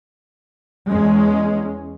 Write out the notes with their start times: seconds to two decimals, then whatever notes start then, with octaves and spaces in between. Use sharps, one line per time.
0.88 E2 G#3 C#4